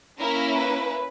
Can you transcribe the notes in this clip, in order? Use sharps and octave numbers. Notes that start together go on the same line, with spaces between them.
A#3 C#4 E4 A#4
B4